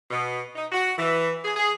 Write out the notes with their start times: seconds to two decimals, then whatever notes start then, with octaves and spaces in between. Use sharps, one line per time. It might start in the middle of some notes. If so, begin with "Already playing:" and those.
0.11 B2
0.56 D#4
0.72 F#4
0.98 E3
1.43 G#4
1.56 G#4